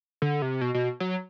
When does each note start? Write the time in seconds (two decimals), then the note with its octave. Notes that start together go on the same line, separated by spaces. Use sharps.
0.22 D3
0.42 C3
0.61 B2
0.75 B2
1.00 F#3